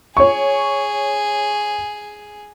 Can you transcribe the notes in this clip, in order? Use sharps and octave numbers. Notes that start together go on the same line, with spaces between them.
G#4 C#5 C#6